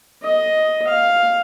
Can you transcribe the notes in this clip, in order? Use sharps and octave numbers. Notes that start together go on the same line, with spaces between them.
D#5
F5